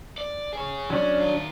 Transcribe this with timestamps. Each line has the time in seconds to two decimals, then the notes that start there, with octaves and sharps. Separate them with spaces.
0.18 D5
0.53 G#4 C#5
0.90 F#3 C#4 D4
1.20 D#3 F4